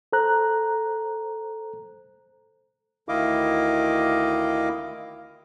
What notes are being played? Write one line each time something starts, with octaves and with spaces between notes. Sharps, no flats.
A4 C5 A#5 F#6
D2 D#3 E4 D#5 F5 D6